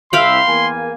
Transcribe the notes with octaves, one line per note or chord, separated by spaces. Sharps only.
C2 E5 F5 G5 B5 C6
E2 A#3 G#5